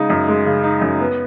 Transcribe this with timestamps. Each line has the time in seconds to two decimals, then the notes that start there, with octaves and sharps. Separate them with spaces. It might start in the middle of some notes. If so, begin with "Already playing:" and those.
Already playing: C#3 G#3 D#4
0.10 F#2
0.28 G#3
0.46 C#3
0.63 D#4
0.81 F#2
1.00 B3